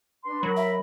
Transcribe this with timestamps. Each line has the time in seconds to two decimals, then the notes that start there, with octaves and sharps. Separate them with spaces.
0.24 D4 B4 C6
0.43 F#3 A#4 B5
0.57 E5